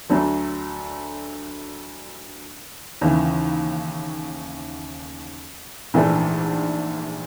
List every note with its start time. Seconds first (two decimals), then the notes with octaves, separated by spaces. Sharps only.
0.10 D2 D3 F#3 A3
3.01 D#2 C#3 E3
5.94 A#1 G#2 E3 A3 D4